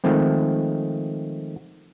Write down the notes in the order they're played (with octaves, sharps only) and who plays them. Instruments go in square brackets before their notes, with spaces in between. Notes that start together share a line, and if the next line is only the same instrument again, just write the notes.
[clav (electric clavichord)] D#3 F3 G#3 A3 C4